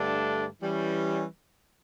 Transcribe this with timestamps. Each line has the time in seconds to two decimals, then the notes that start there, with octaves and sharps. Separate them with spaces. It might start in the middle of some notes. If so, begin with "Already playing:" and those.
Already playing: G2 D3 A3 D4
0.63 E3 G3 C#4